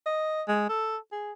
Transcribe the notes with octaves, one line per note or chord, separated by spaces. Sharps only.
D#5
G#3
A4
G#4